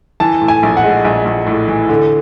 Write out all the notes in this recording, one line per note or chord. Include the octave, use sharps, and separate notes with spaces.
E3 A5
A2
G#5
A#1
F#5
G#3
A#1
A#1
A2
E3
D3